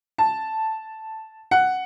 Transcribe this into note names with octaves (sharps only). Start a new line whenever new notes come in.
A5
F#5